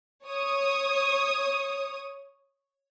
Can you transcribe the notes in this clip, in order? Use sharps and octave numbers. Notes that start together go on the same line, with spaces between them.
C#5 D#6